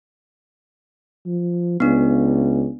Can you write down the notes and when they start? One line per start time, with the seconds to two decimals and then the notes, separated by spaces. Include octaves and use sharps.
1.26 F3
1.80 C#2 B3 D4